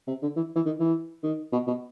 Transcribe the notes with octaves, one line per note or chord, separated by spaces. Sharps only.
C3
D3
E3
E3
D#3
E3
D#3
B2
B2